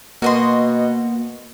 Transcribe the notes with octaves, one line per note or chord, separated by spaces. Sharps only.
B2 A#3 F#4 D#5 C6